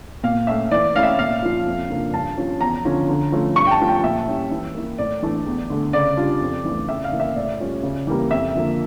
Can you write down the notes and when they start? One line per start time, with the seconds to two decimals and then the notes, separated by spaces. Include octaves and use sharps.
0.23 A#2 F5
0.47 A3 C#4 E5
0.71 E3 D5
0.95 A3 C#4 E4 F5
1.03 E5
1.19 A#2 F5
1.42 F3 C#4 F4
1.66 F2
1.90 C#3 F3 A#3 D4
2.13 G2 A5
2.37 F3 C#4 F4
2.61 E2 A#5
2.85 D3 F3 C#4
3.09 D3
3.32 F3 A3 C#4
3.56 G2 C#6
3.67 G5
3.71 A5
3.80 F3 A3 C#4
3.88 G5
4.03 A#2 E5
4.27 G3 C#4 E4
4.51 E3
4.75 A#3 E4
4.98 A2 D5
5.22 E3 A3 D4
5.46 E2
5.70 D3 A3
5.93 C#3 D5
6.17 G3 D4 F4
6.41 F2
6.65 E3 A3
6.89 C#3 E5
7.04 F5
7.12 E3 A#3
7.20 E5
7.36 A2 D5
7.60 G3 C#4 F4
7.83 C#3
8.07 E3 G3 A#3
8.31 F2 E5
8.55 D3 F3 A#3